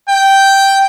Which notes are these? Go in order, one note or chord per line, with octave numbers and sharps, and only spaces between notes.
G5